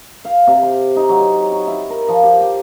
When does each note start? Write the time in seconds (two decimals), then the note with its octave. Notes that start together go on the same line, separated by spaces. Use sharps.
0.25 F5
0.47 C3
0.63 C6
0.96 D#4
1.09 F#3
1.21 C#5
1.52 C#6
1.67 E4
1.90 A#4
2.08 F3
2.23 G4
2.41 D6